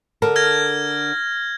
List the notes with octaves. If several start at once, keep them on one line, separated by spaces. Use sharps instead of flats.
D3 A4 A#4
F6 G#6 A#6